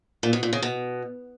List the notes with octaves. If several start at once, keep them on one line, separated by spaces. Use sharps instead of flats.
A#2
B2
A#2
C#3
B2